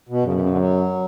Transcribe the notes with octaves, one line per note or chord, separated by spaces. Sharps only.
B2
F#2 C#3
B2
C#3
D3
F#3